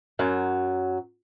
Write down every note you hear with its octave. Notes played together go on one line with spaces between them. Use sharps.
F#2 F#3